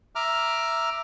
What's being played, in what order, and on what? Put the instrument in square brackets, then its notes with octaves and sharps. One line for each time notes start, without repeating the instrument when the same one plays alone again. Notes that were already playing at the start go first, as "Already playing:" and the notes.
[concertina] E5 A#5 D6 F6